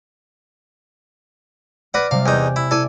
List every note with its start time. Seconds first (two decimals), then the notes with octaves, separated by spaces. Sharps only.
1.94 B4 D5 F#5 F6 A#6
2.11 C3 G3 F5
2.26 E2 D#4 D5 G#5 G6
2.56 E4
2.71 E4 A4 D5 G#5